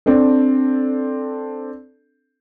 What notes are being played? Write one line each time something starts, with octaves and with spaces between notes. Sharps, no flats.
C4 D4 A4